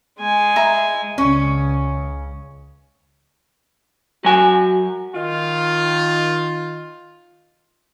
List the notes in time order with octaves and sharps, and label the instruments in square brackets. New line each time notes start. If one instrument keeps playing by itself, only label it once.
[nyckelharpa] G#3 G#5
[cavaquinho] E4 A#5
[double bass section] C#2 C#3 [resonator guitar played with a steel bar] C#4
[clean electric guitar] F#3 G#5 [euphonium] F#4
[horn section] D#3 F4